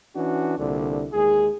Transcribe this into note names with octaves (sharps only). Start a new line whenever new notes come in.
E3 C#4 D4 F#4
C2 A#2 D3
D#2 G#3 G#4